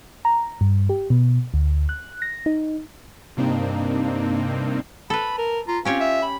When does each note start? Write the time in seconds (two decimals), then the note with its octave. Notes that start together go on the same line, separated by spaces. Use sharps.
0.25 A#5
0.61 G2
0.89 G4
1.10 B2
1.54 D2
1.89 F#6
2.22 A#6
2.46 D#4
3.37 G2 C3 A#3 C4 D4 D#4
5.10 A4 B4 B5
5.38 A#4
5.68 F4 A#5
5.85 C4 C#4 F4 G4 C#5
6.00 E5
6.22 B5